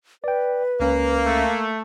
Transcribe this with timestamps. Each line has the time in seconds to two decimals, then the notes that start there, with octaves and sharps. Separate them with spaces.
0.24 B4 D5 G5
0.80 C#2 A#3 C#4
1.26 A3